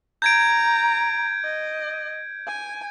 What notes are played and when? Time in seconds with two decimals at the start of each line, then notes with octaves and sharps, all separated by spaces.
0.22 A#5 G6 G#6 D7
1.45 D#5
2.47 G#5